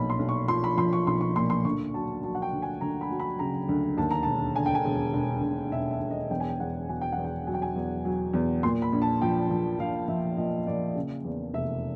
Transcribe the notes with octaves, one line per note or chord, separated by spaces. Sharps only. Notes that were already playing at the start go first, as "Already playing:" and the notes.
Already playing: B1 A#2 F3 B5
C6
B1
C#6
F3 C6
B5
F3 C6
C#6
B1 C6
C#6
A#2 C6
C6
D2 C#6
F#3 A5
F#3 A5
F#5
G5
D2
G#5
D2 A#5
B5
F#3
B5
C#3 A#5
D2
D#2 A5
A#5
E1 A5
D3 G#5
G5
G#5
E1
E1
E1
E1 E5
E5
E1
D#5
E2 G5
G#5
G5
E2 F#5
B2 G#5
G5
E2 F#5
G5
F#3 G#5
G5
G#5
E2
F#3
E2
A#2 C6
B5
A#1
A5
F3 G5
F3
F3 F5
F3 E5
A#2 D#5
A#2 D5
C#3
E2
F1 E5